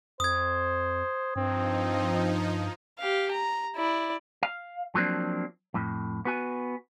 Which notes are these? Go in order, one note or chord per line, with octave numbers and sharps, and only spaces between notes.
F2 C5 D#6 G#6
G2 F3 C4 D#4
G4 F5
A#5
E4 D5
F5
F3 F#3 A#3 C4 D4
F2 A2
B3 F#4 G#5